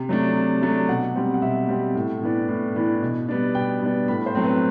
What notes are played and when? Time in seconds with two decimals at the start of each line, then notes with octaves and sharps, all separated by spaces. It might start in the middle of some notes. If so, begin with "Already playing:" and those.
Already playing: C3
0.09 F#3 A3 D4
0.36 C3
0.62 F#3 A3 D4
0.89 B2 F#5
1.16 G3 C4
1.34 F#5
1.42 B2 E5
1.69 G3 C4
1.95 A2
2.22 E3 B3 D4
2.48 A2
2.76 E3 B3 D4
3.02 B2
3.28 G3 B3 D4
3.55 B2 G5
3.82 G3 B3 D4
4.08 A2 B5
4.26 C5
4.35 F#3 A3 C4
4.44 B4